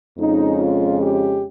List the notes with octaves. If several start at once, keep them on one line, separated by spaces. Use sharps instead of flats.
F2 C#3 G#3 C#4 D#4
F4
G4